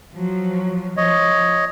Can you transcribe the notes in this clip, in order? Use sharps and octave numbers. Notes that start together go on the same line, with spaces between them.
F3 F#3
F3 C#5 D#5